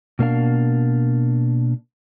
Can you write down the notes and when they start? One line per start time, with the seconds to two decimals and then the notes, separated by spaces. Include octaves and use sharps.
0.19 B2 A#3 D4 F5